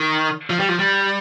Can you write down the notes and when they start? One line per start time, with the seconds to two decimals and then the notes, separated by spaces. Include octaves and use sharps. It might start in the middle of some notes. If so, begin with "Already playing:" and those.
Already playing: D#3
0.50 F3
0.59 G3
0.69 F3
0.79 G3